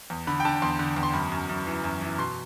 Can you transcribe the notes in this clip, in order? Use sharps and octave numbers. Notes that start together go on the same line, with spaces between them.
E2
D3 B5
G5
D3 A5
E2 C6
D3
E2
C6
F#2 B5
F#2
F#2
E3
F#2
E3
B2 C6